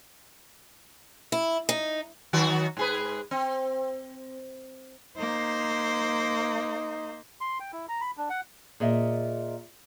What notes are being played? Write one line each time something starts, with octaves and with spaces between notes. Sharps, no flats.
E4
D#4
D#3 F#3 F#4
G#2 G#4 B4
C4
A#3 D#4 C5
C6
G5
E4
A#5
B5
D4
F#5
A#2 G#4 D#5 E5